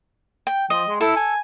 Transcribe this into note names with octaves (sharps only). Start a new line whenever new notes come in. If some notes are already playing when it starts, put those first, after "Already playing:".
G5
F3 D#5
G#3
E4 A4
G#5